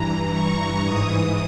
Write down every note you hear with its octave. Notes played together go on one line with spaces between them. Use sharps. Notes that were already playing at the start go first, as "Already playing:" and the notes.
Already playing: G2 E3 A#5
C#6
G#2 E3 D#6